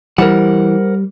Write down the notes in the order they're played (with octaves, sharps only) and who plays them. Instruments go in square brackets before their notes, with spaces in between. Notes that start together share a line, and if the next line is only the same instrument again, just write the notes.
[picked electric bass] E3 [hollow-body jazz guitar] G3 [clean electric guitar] A#4 C5 F#5